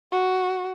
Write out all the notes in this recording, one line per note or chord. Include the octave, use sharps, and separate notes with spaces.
F#4